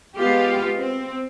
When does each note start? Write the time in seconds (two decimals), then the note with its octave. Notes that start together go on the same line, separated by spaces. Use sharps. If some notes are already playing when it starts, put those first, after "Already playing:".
0.17 G#3 B3 F4 G4
0.78 C4